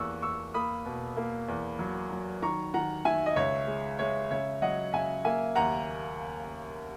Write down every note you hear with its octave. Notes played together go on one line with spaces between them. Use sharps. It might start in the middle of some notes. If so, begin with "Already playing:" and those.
Already playing: E2 A#3 C#6 E6 F#6
E2 C#6 E6
A#3 B5 D#6
B2
A#3
E2
F#3
F#3
D#3 A#5 C#6
D#3 F#5 A#5
D#3 E5 G#5
D#5
C#2 C#5 E5
G#3
G#3 C#5 E5
C#3 C#5 E5
F#3 D#5 F#5
C#3 E5 G#5
A#3 E5 G#5
D#2 F#5 A#5